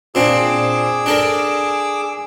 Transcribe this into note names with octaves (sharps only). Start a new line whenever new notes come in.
A#2 C4 D4 G#4 D6 E6
D4 A4 A#4